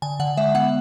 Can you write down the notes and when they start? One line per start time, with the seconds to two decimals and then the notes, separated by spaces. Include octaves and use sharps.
0.02 D3 G#5
0.20 D3 F#5
0.37 G#3 E5
0.54 B3 F#5